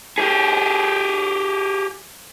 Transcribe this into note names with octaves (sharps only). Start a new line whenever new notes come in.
G4 G#4